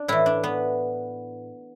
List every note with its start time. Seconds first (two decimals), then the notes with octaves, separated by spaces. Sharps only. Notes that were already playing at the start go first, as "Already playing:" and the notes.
Already playing: D4
0.08 A2 E3 E4
0.26 D4
0.44 B3